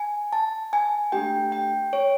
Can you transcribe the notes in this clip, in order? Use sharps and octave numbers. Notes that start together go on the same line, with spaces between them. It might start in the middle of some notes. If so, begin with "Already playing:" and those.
Already playing: G#5
A5
G#5
A3 D4 G4 G5
G5
C#5